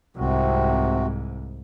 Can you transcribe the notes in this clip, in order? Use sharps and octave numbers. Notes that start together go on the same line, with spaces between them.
C2 G#2 C3 C4 F#4